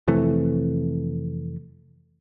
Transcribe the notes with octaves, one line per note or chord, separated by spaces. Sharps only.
F2 C3 E3 A3